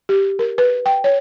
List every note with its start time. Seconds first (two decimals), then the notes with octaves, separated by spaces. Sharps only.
0.09 G4
0.39 A#4
0.58 B4
0.86 G5
1.04 C#5